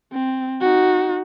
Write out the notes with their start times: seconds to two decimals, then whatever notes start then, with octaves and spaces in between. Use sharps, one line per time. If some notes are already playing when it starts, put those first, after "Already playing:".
0.13 C4
0.61 D#4 F#4